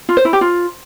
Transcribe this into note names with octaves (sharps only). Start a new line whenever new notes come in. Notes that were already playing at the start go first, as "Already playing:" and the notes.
F4
C5
E4
G4
F4